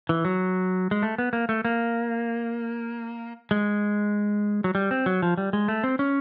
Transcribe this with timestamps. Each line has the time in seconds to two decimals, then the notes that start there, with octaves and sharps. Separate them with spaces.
0.09 E3
0.25 F#3
0.91 G#3
1.03 A3
1.18 B3
1.33 A#3
1.49 A3
1.65 A#3
3.51 G#3
4.64 F#3
4.75 G3
4.91 C4
5.06 F#3
5.22 F3
5.38 G3
5.53 G#3
5.68 A3
5.84 C4
5.99 C#4